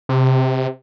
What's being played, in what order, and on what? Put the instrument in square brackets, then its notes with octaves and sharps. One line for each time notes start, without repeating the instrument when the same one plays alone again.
[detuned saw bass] C3